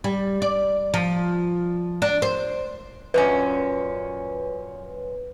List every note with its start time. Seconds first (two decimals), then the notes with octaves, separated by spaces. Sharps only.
0.04 G3
0.42 D5
0.94 F3
2.02 D4
2.22 C5
3.14 F#2 A#2 C#4 B4